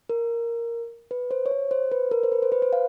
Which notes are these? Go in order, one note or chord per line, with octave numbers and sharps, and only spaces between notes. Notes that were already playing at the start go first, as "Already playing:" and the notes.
A#4
B4
C5
C#5
C5
C5
B4
A#4
C5
B4
C5
B4
C5
F5